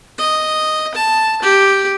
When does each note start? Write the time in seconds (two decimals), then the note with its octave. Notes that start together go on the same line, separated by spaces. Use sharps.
0.18 D#5
0.95 A5
1.42 G4